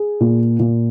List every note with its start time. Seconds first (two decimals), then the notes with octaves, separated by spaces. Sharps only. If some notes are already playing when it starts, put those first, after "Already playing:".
Already playing: G#4
0.20 A#2
0.59 A#2